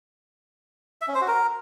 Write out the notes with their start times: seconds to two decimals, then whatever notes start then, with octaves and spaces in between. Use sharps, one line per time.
1.01 E5
1.08 C#4
1.15 C5
1.21 F#4
1.28 A#4